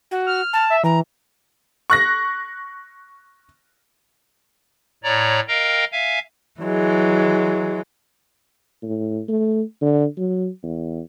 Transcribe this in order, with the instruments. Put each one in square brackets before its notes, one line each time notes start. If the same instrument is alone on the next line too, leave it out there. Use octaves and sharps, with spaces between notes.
[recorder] F#4
[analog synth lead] F6
[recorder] A5
[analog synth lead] E5
[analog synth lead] E3 [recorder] A#5
[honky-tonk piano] C#6 F#6 A#6
[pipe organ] A2 C#5 D5 A#5
A#4 D#5 F5 G5 A#5
E5 F5 G#5
[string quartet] E3 F#3 G#3
[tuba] A2
A3
D3
F#3
E2